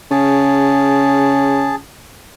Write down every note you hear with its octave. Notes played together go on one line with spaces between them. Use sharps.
C#3 G#4 A5